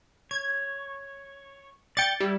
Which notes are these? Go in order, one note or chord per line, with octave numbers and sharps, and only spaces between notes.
C#5 G#6
D5 G5 A6 C#7
G3 E4